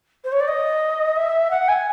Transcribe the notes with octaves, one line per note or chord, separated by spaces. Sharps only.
C5
C#5
D5
D#5
E5
F#5
G#5